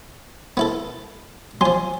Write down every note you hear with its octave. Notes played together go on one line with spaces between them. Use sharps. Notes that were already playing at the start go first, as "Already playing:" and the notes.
B3 E4 A4
F3 F#3 G#5 C6